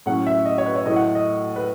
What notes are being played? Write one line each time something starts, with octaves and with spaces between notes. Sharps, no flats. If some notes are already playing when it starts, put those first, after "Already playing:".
A2 F#3 C#4 F#5
E5
D#5
C#5
B4
C#5
A2 F#3 A3 E4 D#5
F#5
D#5
B4